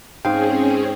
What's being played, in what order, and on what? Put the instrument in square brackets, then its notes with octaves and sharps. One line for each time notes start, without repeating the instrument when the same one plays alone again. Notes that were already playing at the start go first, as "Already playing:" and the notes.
[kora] G#2 F5 [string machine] C4 C#4 G#4 [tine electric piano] G5